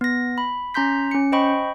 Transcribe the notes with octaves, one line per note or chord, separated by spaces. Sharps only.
B3 A#6
B5
C#4 A#5 C6 G6 B6
C#4 C#7
C5 D#5 G5 B5 C#6